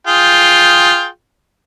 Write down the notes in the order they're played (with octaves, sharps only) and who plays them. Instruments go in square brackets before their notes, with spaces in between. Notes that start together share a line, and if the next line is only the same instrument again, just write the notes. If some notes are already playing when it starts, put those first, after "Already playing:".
[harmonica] F4 G#4 G5